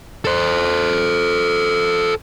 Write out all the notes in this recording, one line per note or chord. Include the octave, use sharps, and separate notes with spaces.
A4 C5